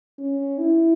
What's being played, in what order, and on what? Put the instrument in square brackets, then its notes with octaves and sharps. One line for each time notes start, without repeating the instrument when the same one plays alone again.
[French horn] C#4
E4